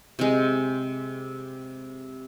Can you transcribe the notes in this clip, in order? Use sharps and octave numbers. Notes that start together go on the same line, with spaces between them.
C3 G#3